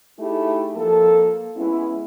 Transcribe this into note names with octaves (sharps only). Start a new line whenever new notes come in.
A3 D#4 E4 G4 G#4
F2 F3 A#3 A4
G#3 B3 C#4 E4